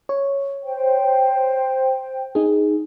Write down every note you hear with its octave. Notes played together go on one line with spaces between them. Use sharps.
C#5
C5 G5
D#4 G#4